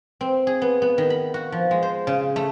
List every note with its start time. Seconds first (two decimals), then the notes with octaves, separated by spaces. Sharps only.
0.21 C4
0.47 G#4
0.62 B3
0.82 B3
0.98 D#3
1.10 B5
1.34 F#4
1.52 F3
1.71 G#3
1.83 C5
2.07 C#3
2.36 A3